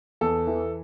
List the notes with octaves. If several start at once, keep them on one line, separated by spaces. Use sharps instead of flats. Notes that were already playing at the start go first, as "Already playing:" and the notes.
E2 A4
E3